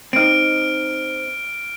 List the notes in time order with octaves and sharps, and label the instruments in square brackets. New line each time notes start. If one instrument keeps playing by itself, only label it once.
[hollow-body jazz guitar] C4 D#4 [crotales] F6 D7